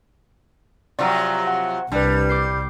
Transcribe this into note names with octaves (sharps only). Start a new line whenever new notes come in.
C3 F3 F#3 D5 A#5
F#5
C2 G3 D4 B4
D6 G6 C7